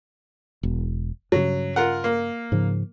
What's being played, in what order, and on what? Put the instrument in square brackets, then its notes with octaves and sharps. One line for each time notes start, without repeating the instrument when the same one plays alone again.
[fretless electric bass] E1
[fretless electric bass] G2 C#3 [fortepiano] F#3
[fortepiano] F4 A#4 F#5
A#3
[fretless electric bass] G#2 C#3 F3